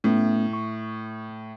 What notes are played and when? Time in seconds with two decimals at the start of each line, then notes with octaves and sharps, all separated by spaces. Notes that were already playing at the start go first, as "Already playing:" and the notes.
0.04 A2 A3 B3 C#4
0.53 C#6